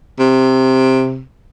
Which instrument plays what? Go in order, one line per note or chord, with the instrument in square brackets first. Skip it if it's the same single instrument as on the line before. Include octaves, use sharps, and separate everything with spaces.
[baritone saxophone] C3